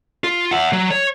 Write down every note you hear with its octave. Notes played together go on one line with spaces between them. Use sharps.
F4
E5 F#5
F#3
C#5